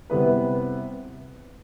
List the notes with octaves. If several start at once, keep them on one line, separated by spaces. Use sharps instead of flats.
C3 G3 B3 E4 B4